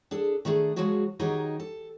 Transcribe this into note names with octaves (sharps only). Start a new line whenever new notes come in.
D4 G#4 A4
D#3 A3 D4 G#4
F3 F#3 G#3 F#4 G#4
D#3 F#3 D#4 G4 G#4 D#5
A4